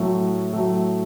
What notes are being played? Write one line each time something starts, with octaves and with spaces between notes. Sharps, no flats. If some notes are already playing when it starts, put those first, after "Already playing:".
Already playing: A2 F#3 A3
A2 F#3 A3